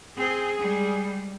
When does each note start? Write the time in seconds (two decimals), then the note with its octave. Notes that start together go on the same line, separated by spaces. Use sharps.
0.17 C4 G#4
0.60 G3 G#3